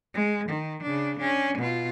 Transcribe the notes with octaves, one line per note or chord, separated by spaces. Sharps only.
G#3
D#3
C#3 D4
C#4 D4
B2 F4